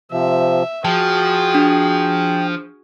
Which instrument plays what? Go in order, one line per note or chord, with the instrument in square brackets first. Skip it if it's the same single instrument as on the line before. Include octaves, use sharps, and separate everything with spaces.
[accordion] C3 F3 [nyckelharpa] E5
[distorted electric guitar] F3 [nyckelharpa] F#4 G#4 [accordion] G5 [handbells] A5
[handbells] D4